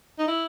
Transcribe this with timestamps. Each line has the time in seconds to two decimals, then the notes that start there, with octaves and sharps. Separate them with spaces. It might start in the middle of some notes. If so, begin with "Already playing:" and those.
0.19 D#4
0.28 E4